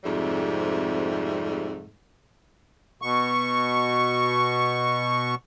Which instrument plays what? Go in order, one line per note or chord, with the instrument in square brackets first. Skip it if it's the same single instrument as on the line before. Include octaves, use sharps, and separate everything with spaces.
[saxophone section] F2 G#2 C3 G3 A3
[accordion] B2 C#6